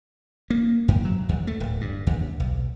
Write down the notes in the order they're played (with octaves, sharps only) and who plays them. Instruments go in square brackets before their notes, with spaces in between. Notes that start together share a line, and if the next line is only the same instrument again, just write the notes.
[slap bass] A#3
F#2
F#3
D#2
A3
D1
G2
D#2
B1